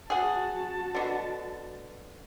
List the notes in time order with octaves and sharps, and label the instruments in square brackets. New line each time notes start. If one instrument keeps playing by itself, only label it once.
[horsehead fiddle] F#4 A5 [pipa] G#4 F#5
[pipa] B2 D3